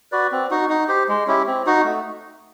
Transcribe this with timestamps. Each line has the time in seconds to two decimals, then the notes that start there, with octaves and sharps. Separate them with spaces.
0.12 F#4 B4 D5
0.32 C4
0.51 D#4 F#4
0.69 D#4
0.88 G4 C5
1.08 G#3
1.27 C#4 E4 G4
1.47 C4
1.66 D#4 F#4
1.84 A3